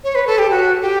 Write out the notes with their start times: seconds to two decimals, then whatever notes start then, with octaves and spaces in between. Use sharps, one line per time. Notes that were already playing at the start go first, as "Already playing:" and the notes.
0.04 C#5
0.15 B4
0.27 A4
0.39 G4
0.51 F#4
0.82 G4